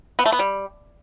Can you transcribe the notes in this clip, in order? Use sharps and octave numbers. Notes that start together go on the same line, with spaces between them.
B3
A3
B3
G3